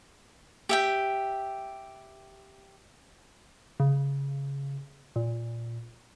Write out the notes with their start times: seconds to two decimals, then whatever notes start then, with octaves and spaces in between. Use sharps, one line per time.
0.69 G4 E5 G5
3.80 C#3
5.16 A#2